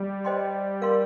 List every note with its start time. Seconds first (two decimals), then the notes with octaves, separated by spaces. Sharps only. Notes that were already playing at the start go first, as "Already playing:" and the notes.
Already playing: G3
0.25 C5 D#5 G5 C6
0.82 A#4 F5 C6